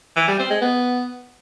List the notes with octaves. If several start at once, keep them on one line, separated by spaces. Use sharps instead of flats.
E3
G3
C4
G#3
B3